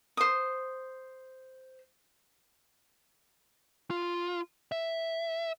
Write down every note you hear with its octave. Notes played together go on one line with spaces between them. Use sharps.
C5 D#6
F4
E5